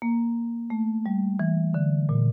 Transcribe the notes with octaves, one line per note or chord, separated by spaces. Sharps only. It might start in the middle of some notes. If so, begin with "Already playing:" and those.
A#3
A3
G3
E3
D3
A#2